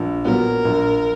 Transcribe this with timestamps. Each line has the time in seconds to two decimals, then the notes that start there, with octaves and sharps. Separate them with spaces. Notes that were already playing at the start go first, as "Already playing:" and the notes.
Already playing: A#1
0.25 A#2 F#3 B3 A#4
0.65 A#1